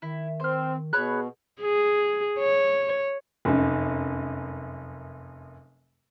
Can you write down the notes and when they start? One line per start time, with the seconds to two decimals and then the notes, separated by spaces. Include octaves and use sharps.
0.02 D#3 E4
0.40 C4 C5 F6
0.93 B2 G#4 C#5 B5 F#6
1.62 G#4
2.39 C#5
3.45 F1 F#2